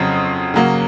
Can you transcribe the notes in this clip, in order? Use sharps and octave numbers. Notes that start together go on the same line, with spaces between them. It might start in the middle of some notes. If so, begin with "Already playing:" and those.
Already playing: F2 C#3 F#3 C4
C#3 F#3 A#3